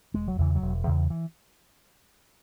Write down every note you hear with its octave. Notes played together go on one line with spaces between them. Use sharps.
E1 G#3
F#3
E2 C#3 E3
F#3
E1
E2 C#3
E3